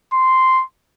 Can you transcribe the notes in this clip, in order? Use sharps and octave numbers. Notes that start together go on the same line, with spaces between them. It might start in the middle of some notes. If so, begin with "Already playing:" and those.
C6